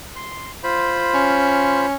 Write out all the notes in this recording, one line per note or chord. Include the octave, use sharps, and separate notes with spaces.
C6
F4 C5 B5
C#4